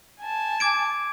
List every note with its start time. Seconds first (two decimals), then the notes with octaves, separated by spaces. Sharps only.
0.21 G#5 A5
0.60 D6 G#6 D7